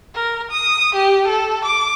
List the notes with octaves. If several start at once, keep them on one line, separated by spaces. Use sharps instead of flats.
A#4
D#6
G4
A4
D6